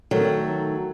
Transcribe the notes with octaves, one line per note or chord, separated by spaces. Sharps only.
D#3 F#3 A3